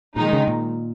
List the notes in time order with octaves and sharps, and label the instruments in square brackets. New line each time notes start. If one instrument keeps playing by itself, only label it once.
[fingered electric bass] A#2 [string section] D#3 G#3 D#4
[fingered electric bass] C#3
A#2